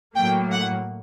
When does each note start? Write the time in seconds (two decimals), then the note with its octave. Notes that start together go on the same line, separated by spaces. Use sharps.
0.15 A2 F#3 A#3 G5
0.51 F#5